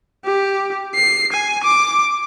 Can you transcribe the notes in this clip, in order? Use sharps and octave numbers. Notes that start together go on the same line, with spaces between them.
G4
C7
G#5
D6